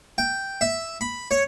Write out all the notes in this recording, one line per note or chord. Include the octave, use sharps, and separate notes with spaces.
G5
E5
B5
C#5